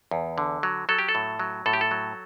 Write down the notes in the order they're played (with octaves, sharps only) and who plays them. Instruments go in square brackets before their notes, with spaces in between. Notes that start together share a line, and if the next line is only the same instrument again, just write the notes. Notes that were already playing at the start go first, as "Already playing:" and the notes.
[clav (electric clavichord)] E2
D3
F#3
F#3 A4
G4
A4
A2
F#3
A2 A4
G4
A4
F#3